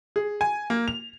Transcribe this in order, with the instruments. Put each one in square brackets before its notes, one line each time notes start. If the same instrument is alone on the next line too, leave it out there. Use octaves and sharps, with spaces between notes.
[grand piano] G#4
G#5
A#3
F7